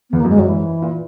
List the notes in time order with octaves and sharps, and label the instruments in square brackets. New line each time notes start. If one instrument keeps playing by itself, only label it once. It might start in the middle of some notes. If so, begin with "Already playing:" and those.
[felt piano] E2 [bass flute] B3
[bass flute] A#3
[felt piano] F#2
[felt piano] G#2 [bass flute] G#3
[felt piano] F#2 [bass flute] F#3
[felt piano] G#2 [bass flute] E3
[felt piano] A#2